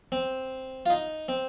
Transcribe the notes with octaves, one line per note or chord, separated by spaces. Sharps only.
C4
F4
D#4
C4